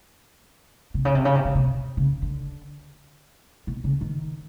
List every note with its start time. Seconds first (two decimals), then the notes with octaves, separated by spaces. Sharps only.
0.94 C3
1.05 C#3
1.15 C3
1.25 C#3
1.35 C3
1.45 C#3
1.55 C3
1.97 C#3
2.22 D3
3.67 B2
3.84 C#3
4.01 D#3